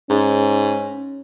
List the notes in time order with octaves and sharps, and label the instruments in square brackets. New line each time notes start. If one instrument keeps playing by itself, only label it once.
[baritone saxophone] G#2 [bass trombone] C#4